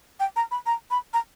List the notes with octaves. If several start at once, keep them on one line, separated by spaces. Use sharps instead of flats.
G5
A#5
B5
A#5
B5
A#5